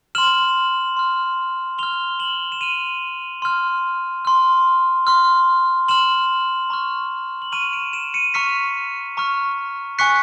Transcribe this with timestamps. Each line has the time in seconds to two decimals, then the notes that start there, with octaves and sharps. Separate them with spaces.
0.15 C6 F6 E7 F#7
0.97 C6 F6
1.78 C6 F6 F7 G7
2.19 E7 F#7
2.52 E7
2.61 C6 F6 D#7 F7
3.42 C6 F6
4.25 C6 F6
5.07 C6 F6
5.88 C6 F6 E7 F#7
6.70 A#5 C#6 F6
7.42 F#7
7.52 A#5 C#6 F6 D#7 F7
7.73 D7 E7
7.93 D7 E7
8.14 C#7 D#7
8.34 A#5 C#6 F6 B6 C#7
9.17 A#5 C#6 F6
9.98 G#5 C#6 F#6 B6 C#7